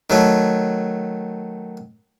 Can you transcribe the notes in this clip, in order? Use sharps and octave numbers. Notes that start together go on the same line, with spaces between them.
D#3 F#3 A3